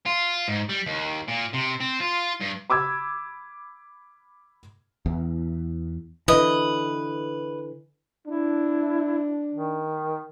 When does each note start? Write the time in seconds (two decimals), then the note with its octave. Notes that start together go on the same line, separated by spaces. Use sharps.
0.06 F4
0.48 G#2
0.69 G3
0.86 D#2
1.28 A#2
1.53 C3
1.80 C4
2.00 F4
2.40 G2
2.70 B5 D6 E6 G#6
5.06 E2
6.28 D3 E3 B4 D#5
8.27 D4 E4
9.54 D#3